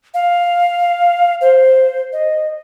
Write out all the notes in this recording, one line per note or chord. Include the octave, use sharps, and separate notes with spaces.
F5
C5
D#5